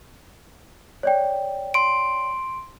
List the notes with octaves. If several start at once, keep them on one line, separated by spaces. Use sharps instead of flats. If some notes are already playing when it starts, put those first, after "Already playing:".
C#5 D5 G5
C6 D7